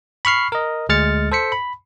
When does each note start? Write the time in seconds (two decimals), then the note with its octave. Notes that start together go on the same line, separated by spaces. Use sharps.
0.25 B5 C#6 F6 C7
0.52 A#4 D#5
0.89 D2 G#3 F6 A6 C#7
1.31 A4 C5 B6 C#7
1.52 B5